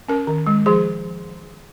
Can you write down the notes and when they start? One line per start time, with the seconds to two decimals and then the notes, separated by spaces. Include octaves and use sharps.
0.08 C#4 A#4
0.27 D#3
0.47 G#3
0.66 F3 G#4